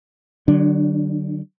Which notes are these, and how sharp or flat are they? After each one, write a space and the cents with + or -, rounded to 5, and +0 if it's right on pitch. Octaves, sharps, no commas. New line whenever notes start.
D3 +35 F#3 +35 D4 +0